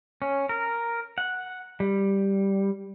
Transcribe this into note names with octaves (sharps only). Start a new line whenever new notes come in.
C#4
A#4
F#5
G3